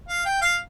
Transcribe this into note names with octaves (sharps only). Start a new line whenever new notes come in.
F5
G5
F5